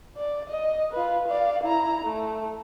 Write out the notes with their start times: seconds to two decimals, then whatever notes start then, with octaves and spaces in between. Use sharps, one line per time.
0.17 D5
0.49 D#5
0.92 F4 B4
1.28 D5 F5
1.63 E4 A#5
2.04 A3